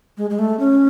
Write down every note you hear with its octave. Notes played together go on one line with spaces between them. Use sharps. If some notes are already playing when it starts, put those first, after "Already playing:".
G#3
G#3
A3
C#4